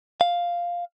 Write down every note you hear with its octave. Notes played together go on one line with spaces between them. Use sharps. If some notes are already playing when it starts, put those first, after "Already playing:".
F5